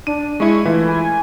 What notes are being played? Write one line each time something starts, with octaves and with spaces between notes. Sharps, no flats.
D4 D#7
G#3 E4 C#6
E3 A3 E4 F4
G#5